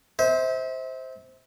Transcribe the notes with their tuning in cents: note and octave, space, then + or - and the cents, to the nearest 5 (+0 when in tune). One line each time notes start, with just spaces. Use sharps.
C5 +0 E5 -35